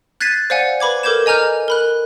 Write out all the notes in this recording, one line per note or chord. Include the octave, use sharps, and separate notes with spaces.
F#6 G#6 A6 B6 C7 D#7
C5 D5 F5 F#5 G#5
B4 B5 D6 G#6
A4 A#4 D6 G6 G#6 E7
D#5 G#5 A#5 F6 G6
A#4 B5 F#6